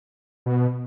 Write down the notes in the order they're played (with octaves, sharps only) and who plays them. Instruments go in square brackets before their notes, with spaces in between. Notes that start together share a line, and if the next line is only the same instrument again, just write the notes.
[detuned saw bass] B2